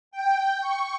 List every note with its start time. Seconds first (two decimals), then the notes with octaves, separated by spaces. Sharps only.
0.11 G5
0.60 C#6